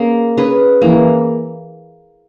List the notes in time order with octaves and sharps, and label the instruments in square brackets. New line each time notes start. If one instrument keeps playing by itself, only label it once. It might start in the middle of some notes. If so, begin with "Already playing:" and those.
Already playing: [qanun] A#3 C#4 G#4
C#4 G#4 B4
[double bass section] E3 [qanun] A#3